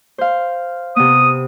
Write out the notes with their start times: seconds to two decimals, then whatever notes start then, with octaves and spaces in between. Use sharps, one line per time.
0.18 C5 F5
0.96 C3 B3 D#6